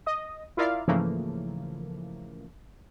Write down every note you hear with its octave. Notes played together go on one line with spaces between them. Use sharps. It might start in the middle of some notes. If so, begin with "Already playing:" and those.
D#5 D#6
E4 F4 A#4 D5 E5 F5
G#2 C#3 E3 F3 A3 A#3